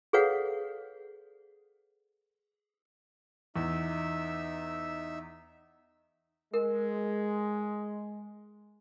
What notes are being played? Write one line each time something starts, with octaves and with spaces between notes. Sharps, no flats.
G#4 A4 B4 C#5 F5 F#5
E2 D#4 E5 E6
G#3 A#4